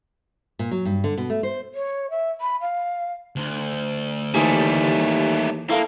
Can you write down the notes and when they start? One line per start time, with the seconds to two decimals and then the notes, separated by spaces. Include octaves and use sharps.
0.59 A#2
0.71 F#3
0.85 G2
1.04 D3
1.18 B2
1.30 A3
1.43 C5
1.74 C#5
2.10 E5
2.41 B5
2.61 F5
3.36 D2
4.34 D#2 E3 G3 A3 G#4
5.70 A#3 E4 A4 F5